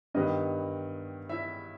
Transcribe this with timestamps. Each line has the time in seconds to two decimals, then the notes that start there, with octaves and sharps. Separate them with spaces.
0.14 G2 D#3 G3 B3 D#5
1.29 E4 E5